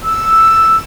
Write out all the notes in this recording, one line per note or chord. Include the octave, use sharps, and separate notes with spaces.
E6